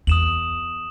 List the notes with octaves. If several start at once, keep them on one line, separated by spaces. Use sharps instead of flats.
E2 D#6 E7 F#7